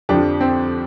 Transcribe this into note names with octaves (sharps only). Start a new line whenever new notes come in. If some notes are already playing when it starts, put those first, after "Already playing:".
F2 D3 F3 D4 G4
C4